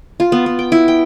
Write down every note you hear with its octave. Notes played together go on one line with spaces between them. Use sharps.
F4
B3
B3
G5
E4
G5